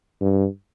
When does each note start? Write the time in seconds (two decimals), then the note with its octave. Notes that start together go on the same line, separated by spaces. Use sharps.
0.21 G2